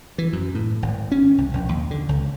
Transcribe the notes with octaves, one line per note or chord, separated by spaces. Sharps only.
E3
F#2
A2
G#1
C#4
C2
A#1
D#2
D3
C#2